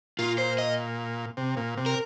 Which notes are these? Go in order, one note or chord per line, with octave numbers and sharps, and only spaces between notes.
A#2 F4
C5
D#5
C3
A#2
C3
A#4